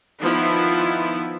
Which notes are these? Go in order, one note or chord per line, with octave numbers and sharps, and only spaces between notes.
D#3 F3 B3 E4